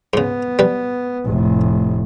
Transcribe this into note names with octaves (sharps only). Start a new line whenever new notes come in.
G#2 C#3 B3
G3 B4
F1 A2